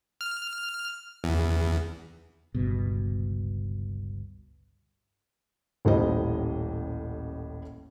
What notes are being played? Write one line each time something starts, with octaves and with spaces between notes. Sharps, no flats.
F6
E2
G1 C#2 G2 B2
D#1 A1 A2 G3 C5 D#5